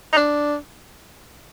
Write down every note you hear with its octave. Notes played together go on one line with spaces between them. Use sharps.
D#4
D4